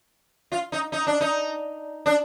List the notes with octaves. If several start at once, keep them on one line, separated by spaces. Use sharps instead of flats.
F4
D#4
D#4
D4
D#4
D4